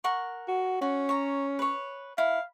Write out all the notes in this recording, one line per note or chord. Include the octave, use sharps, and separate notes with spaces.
A#4 F#5 C#6
F#4
C#4 F#4
C#5 A#5
B4 C#5
E4 F5